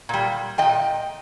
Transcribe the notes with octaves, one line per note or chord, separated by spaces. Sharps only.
A#2 G3
A#2 F3 D#5 G5